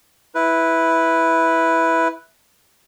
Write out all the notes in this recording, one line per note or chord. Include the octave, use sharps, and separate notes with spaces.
E4 B4